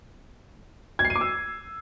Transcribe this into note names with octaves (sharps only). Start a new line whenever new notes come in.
G#6
C7
D#7
D6
E6